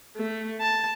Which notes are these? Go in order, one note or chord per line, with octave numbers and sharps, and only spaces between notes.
A3
A5